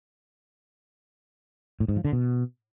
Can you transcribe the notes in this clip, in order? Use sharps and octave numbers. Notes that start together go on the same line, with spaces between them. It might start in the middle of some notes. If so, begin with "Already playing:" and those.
A2
G#2
F3
D3
B2